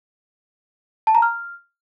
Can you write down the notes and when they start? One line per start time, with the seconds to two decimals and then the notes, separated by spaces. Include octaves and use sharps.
1.07 A5
1.15 A#5
1.22 F6